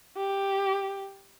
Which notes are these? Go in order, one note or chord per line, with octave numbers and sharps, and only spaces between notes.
G4